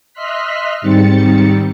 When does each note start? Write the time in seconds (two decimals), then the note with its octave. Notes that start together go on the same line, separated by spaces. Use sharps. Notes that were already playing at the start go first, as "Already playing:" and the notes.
0.13 D#5 E5 C6 F6 F#6 B6
0.81 G#2 D#3 G3 C4 A6 C#7